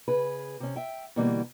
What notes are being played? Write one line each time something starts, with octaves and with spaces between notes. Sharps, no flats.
C#3 G#4 B4
C3 C#4
E5 G5
B2 D3 E3 G3 A#3